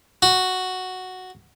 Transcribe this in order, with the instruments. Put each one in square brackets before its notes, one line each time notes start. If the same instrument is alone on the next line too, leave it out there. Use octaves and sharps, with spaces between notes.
[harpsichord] F#4